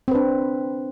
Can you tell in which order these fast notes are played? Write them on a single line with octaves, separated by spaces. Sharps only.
C4 B4 D4